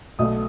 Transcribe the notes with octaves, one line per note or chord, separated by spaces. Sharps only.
B1 B2 A3 D#5 D#6